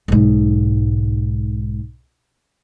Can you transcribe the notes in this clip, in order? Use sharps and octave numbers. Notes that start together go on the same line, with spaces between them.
B1 G#2